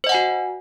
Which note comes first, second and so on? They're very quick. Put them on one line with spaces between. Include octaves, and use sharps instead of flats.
C5 D#5 F#5 G#5 F#4